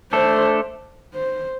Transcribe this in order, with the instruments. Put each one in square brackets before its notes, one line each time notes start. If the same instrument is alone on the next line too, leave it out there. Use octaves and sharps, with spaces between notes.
[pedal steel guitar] A3 D4 A4 [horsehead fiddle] C5
[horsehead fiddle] C5